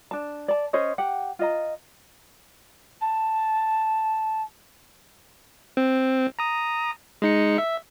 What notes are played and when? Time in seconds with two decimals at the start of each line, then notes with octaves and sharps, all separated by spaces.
0.11 D4 A5
0.48 D5 A5
0.73 C#4 C5 C#5 D#5
0.98 G4 F#5
1.39 F4 D#5 A#5
3.01 A5
5.77 C4
6.39 A#5 D#6
7.22 G#3 D#4 C#7
7.58 E5